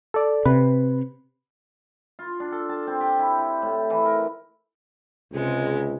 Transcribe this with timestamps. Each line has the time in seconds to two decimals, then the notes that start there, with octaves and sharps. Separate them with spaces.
0.14 A4 D5
0.45 C3 B4
2.19 F4
2.40 D4
2.52 A4
2.69 A5
2.87 C4
3.01 G4
3.19 E4
3.38 E4
3.62 A2
3.90 E3
4.06 A#4
5.33 C#2 C3 G#3